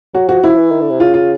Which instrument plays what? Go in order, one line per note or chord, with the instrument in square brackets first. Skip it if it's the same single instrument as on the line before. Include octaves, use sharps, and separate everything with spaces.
[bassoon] F#3 [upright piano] F#4
[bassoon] F3 [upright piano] F#4
[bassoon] F3 [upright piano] E4
[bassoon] E3
D#3
D3
C3
[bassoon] C#3 [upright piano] F4
[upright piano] F4